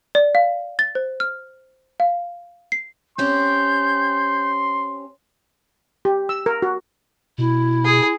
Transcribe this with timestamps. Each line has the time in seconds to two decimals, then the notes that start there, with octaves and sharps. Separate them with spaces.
0.15 D5
0.35 F5
0.79 A6
0.95 C5
1.20 F6
2.00 F5
2.72 C7
3.18 C4 C#4 G4 C6 G6
6.05 G4
6.29 E6
6.46 A#4
6.62 F#4
7.38 B2 E4
7.85 G#4